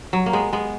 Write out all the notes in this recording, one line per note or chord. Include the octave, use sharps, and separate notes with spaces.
F#3
A#3
G#3 B3
G#3 B3